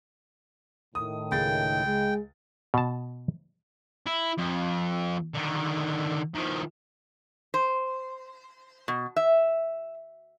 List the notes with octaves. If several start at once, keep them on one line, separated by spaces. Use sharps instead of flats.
A2 D#3 D#6
C#2 G#4 G5 A6
G#3
B2 A5
E4
F2
D3 D#3
D#3 F3
C5
B2
E5